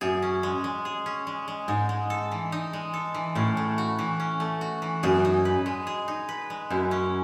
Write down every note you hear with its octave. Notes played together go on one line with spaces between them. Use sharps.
F#2 G#4
C#4
G#3
G#3
G#4
C#4
G#3
G#3
G#2 D#4
G#3
A4
E3
D#4
G#3
A4
E3
A2 C#4
A3
F#4
E3
C#4
A3
F#4
E3
F#2 G#4
D#4
B4
G#3
G#4
D#4
B4
G#3
F#2 E4
C#4